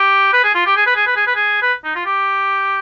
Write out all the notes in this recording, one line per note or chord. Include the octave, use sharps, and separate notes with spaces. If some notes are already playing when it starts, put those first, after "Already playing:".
Already playing: G4
B4
G#4
F4
G4
G#4
B4
G#4
B4
G#4
B4
G#4
B4
D#4
F4
G4